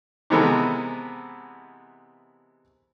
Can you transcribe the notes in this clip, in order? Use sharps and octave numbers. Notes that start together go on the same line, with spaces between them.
C3 E3 G#3 B3 A4 A#4